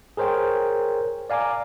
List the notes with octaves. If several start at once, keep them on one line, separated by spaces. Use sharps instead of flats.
G#4 A#4 C5 C#5 G5
D5 F5 G#5 A#5 D6